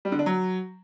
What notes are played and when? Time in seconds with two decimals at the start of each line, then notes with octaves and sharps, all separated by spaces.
0.05 G3
0.12 D3
0.19 D4
0.26 F#3